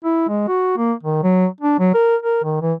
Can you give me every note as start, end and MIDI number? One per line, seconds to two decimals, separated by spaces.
0.05 0.26 64
0.29 0.43 56
0.48 0.76 66
0.78 0.93 58
1.03 1.20 51
1.23 1.46 54
1.60 1.78 62
1.79 1.94 54
1.94 2.16 70
2.22 2.39 70
2.44 2.59 51
2.62 2.73 52